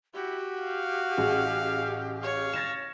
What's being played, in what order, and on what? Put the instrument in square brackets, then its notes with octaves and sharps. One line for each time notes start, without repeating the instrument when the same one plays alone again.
[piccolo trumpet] E4 [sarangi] F#4 [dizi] G4
[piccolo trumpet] F5
[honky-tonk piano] A1 G#4
[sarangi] C#5 [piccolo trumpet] F5
[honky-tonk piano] A6 A#6 E7